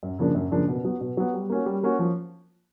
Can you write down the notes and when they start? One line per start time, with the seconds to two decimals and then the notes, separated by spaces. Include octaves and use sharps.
0.03 F#2
0.19 C#3 F3 A#3 D4
0.35 F#2
0.52 C#3 F3 A#3 D4
0.68 B2
0.84 F#3 B3
1.01 B2
1.17 F#3 B3
1.34 G3
1.50 A#3 C#4 F#4
1.66 G3
1.83 A#3 C#4 F#4
1.99 F3